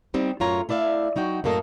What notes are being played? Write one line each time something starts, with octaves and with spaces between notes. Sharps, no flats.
G3 A#3 C4 D#4 G4
F#2 A2 F4 C#5 A#5
A3 E4 D5 E5 F5
F#3 D#4 F#4 G5
F#2 A2 A#3 A4 D#5